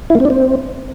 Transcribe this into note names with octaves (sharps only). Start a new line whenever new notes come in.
E4
A#3
C4
D4
C4